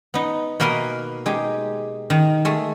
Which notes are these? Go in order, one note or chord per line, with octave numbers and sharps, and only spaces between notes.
B3 D#4
B2 A#3 A#4 B4 D#5 G#5
G#3 D#4 G4
D#3
G#3 A3